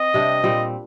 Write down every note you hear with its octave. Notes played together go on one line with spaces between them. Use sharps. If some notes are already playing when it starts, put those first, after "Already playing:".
Already playing: C4 D#5
C3 G3 D4 G4
A#2 G3 C4 G4